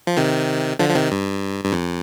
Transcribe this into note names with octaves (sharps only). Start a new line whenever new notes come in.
F3
C3 D#3
D3 F3
F3
C3 D#3
G2
G2
F2